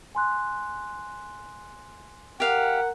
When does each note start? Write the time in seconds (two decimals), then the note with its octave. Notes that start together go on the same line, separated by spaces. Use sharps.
0.15 G#5 C6 F#6
2.40 G4 A#4 F5 F#5